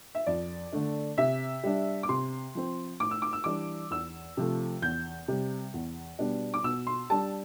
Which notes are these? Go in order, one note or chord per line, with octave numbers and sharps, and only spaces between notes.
E5
F2 D5
D3 A3 D4
C3 E5
G3 D4
D6
C3 C6
F3 C4
A2 D6
E6
D6
E6
E3 G3 D4 D6
E2 E6
C3 F3 A3
E2 G6
C3 G3
E2
B2 G3 B3 D4
D6
B2 E6
C6
G3 D4 A5